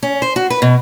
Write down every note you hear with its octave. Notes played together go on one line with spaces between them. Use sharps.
C#4
C5
F#4
B4
B2